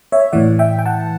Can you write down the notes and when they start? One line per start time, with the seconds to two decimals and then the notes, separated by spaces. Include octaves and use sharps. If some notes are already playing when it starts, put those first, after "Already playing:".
0.12 C#5 E5
0.33 A2 E3 D5 F#5
0.59 E5 G5
0.79 G5
0.86 F#5 A5